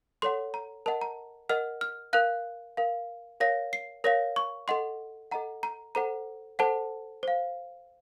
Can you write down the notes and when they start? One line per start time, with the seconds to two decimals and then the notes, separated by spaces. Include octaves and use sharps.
0.22 A4 C#5 F#5 C6
0.54 A#5
0.86 A#4 D#5 F#5 A5
1.01 A#5
1.49 A#4 D#5 F#5 F6
1.81 F6
2.13 A#4 F5 F#6
2.77 A#4 F5
3.40 A#4 C#5 F5 A#6
3.73 C7
4.04 A#4 C#5 F5 A#6
4.36 C#6
4.68 A4 D#5 F#5 C6
5.31 A4 D#5 F#5 A#5
5.63 A#5
5.95 A4 C5 F#5 A#5
6.59 A4 C5 F#5 A5
7.23 C5 F5